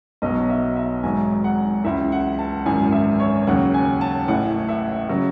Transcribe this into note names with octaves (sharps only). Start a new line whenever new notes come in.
B1 B2 F#3 D#5
E5
E5
G#1 G#2 F#3 G#5
F#5
C#2 C#3 E3 E5
F#5
A5
G#1 F#2 E3 G#5
E5
C#5
D#2 C#3 F#3 F#5
G#5
A5
A1 A2 E3 F#5
E5
C#3 F#3